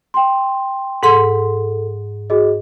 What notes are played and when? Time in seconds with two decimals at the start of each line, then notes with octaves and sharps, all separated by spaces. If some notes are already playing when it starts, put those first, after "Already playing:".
0.14 G5 C6
1.03 G#2 A4 F#5 C6
2.30 F#4 G#4 D#5